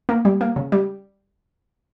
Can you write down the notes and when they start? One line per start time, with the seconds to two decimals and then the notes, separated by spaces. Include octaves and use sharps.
0.09 A#3
0.25 G3
0.41 A#3
0.56 C#3
0.72 G3